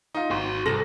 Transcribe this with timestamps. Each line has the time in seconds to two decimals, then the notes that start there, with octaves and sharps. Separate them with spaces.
0.15 D#4 F4
0.31 G#1 F#4 C6
0.66 C2 A4 A#6